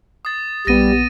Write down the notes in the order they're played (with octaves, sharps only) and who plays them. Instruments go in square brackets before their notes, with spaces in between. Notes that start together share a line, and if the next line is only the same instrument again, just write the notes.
[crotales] D#6 A6
[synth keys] A#1 B3 [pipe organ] G3 [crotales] A#6 D#7